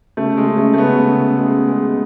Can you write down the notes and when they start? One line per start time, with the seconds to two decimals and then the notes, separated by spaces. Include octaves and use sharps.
0.17 C#3 A3
0.37 G#3
0.48 C#3
0.58 A3
0.74 A3
0.78 C#3 B3
1.08 C#3
1.38 G#3
1.69 G#3